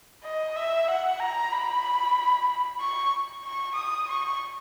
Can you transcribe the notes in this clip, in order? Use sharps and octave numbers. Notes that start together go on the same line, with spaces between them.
D#5
E5
F#5
A#5
B5
C#6
C#6
D#6
C#6